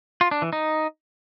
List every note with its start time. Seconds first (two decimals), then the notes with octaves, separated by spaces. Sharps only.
0.21 F4
0.31 D4
0.42 E3
0.53 D#4